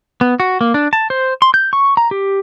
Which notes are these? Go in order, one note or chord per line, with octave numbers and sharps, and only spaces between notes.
B3
F#4
A#3
D4
A5
C5
C6
G6
C#6
A#5
G4